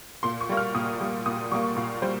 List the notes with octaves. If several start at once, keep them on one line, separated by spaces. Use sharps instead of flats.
A#2 C6
C#6
G3 A#3
F6
A#2 D#6
G3 A#3
A#2 D#6
G3 A#3 C#6
A#2 F5
G3 C5